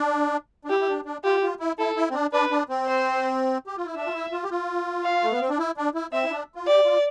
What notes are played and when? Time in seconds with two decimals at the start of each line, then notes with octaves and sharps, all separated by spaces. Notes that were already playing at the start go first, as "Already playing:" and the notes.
Already playing: D4
0.65 D4
0.70 E4 G4
0.80 E4
0.88 D4
1.05 D4
1.24 F4 G4
1.42 F4
1.60 E4
1.78 E4 A4
1.96 E4
2.10 C4
2.14 D4
2.33 D4 B4
2.51 D4
2.69 C4
2.87 C5
3.67 G4
3.77 F4
3.85 E4
3.96 D4 E5
4.07 F4
4.13 E4
4.32 F4
4.44 G4
4.50 F4
5.04 F5
5.24 A3
5.31 B3
5.41 C4
5.49 D4
5.59 E4
5.77 D4
5.94 E4
6.12 C4 E5
6.25 E4
6.31 D4
6.55 F4
6.67 G4 D5
6.85 F4